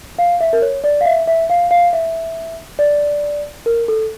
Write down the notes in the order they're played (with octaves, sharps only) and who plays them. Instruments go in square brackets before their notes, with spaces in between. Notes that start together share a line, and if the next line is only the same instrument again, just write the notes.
[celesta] F5
E5
A#4
C#5
D5
F5
E5
E5
F5
F5
E5
D5
A#4
A4